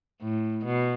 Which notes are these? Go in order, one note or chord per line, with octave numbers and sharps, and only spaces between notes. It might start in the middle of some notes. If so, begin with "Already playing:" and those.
A2
B2